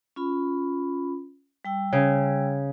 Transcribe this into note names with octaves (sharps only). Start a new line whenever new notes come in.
C#4 F4 B5
G3 G5 E6
C#3